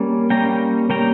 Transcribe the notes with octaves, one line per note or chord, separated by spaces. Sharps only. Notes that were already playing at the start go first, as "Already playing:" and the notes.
Already playing: G3 A#3 C#4
G3 A#3 C#4 G5 A#5
G3 A#3 C#4 G5 A#5